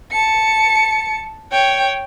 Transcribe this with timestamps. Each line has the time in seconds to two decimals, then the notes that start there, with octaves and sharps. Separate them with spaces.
0.12 A5 C#7
1.52 C#5 G5